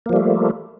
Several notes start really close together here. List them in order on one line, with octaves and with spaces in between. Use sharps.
A#3 F3 G3 A3